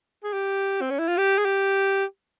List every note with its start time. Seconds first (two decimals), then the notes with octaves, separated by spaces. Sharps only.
0.24 G#4
0.33 G4
0.81 C4
0.90 C#4
0.99 E4
1.08 F4
1.18 G4
1.38 G#4
1.45 G4